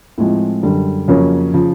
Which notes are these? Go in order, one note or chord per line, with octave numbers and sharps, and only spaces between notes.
A2 F3 G#3 C4
F#2 D3 G3
F2 C#3 F#3 A#3 C#4
C#3 F3